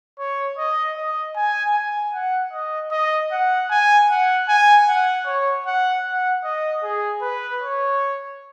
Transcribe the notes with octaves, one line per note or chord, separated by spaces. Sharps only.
C#5
D#5
D#5
G#5
G#5
F#5
D#5
D#5
F#5
G#5
F#5
G#5
F#5
C#5
F#5
F#5
D#5
G#4
B4
C#5